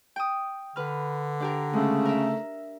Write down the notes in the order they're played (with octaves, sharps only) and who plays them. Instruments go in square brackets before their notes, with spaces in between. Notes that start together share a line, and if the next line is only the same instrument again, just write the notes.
[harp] G5 D#6
[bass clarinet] D3 [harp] B4 F6
[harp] D4 G4 A#4
[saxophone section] C#3 A3 [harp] G#3
[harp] A#4 E5